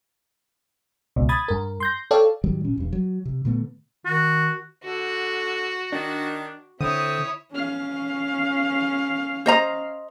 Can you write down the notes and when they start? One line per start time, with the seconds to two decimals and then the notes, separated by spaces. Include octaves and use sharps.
1.16 C#2 B2
1.29 B5 D#6 G#6 A6
1.48 G2 A#4
1.80 C6 G6 A#6
2.11 A4 C#5 D5 F5 G5 A5
2.44 G#2 D#3 F#3 G3
2.65 A#2 C#4
2.78 E1 G2
2.93 F#3
3.25 C3
3.45 A#2 D3 A3 B3
4.06 D#3 F#4
4.84 D3 F#4
5.92 D#3 D4
6.81 D3 C4 E4 C#5 D#6
7.52 C#4 F5
9.46 C5 D#5 A#5